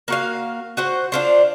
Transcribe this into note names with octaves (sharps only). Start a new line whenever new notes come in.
A#3 F#4 F5
F#4 C5 F#5
D4 F4 C5